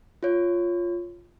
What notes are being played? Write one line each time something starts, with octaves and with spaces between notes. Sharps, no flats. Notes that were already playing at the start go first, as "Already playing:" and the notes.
F4 C#5